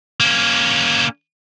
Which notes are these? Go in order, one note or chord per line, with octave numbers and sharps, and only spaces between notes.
A#3 C#4